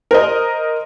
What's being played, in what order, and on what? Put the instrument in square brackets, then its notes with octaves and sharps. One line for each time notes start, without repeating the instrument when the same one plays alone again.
[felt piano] A#4 C5 D#5